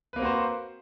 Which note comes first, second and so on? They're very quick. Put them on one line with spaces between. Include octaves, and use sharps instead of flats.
B4 A#3 C4 F#4 C5